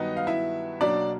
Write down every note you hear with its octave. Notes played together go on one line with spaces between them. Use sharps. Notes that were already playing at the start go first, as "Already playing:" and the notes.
Already playing: G2 D#3 F#3 B3 D#4 D#5
F5
E4 E5
B1 B2 F#3 A#3 C#4 D4 D5